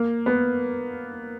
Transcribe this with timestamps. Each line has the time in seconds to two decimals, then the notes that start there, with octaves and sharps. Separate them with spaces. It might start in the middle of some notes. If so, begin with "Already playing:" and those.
Already playing: A#3
0.26 B3